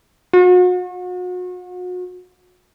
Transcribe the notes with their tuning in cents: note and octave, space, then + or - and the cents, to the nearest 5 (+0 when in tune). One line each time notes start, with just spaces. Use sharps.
F#4 -40